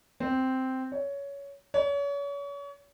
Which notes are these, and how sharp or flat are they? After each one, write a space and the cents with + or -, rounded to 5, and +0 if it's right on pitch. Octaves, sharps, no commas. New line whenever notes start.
C4 -5
C#5 +15
C#5 +35